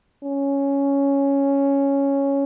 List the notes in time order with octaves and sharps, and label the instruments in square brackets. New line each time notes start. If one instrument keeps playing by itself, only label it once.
[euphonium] C#4